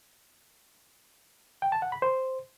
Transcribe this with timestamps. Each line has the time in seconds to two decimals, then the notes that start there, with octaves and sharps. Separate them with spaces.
1.62 G5
1.72 A5
1.82 F#5
1.92 B5
2.02 C5